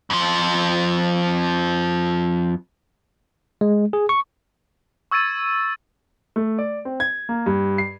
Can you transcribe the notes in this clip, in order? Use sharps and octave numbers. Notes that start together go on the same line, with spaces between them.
F2 F3
G#3
G#4
C#6
C#6 E6 G#6 A6 D#7
A3
D5
C4
G#6
A#3
G2
C7